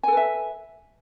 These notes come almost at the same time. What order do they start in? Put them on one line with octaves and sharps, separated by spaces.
G#5 A4 B4 E5